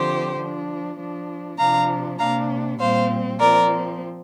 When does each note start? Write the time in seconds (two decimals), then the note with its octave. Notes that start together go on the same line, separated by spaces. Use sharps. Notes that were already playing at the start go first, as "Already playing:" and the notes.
Already playing: D3 F3 C4 G4 C5
0.37 F3 D4
0.97 F3 D4
1.58 C3 F3 D4 F5 A#5
2.18 C3 A#3 D4 F5 A#5
2.79 A#2 G3 C4 C5 F5
3.39 F3 C4 A#4 D5